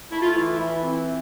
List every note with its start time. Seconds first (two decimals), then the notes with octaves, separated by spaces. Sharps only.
0.11 A3 E4
0.22 F4
0.31 E3 E4
0.59 E3
0.83 C4